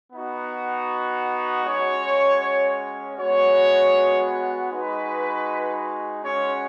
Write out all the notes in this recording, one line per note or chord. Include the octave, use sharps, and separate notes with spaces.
B3 D#4 F#4
G#3 C#4 F#4 C#5
G#3 B3 F#4 C#5
G#3 D#4 F#4 B4
G#3 C#4 F#4 C#5